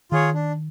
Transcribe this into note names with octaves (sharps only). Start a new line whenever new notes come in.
D#3 F4 G#4 C#5
D4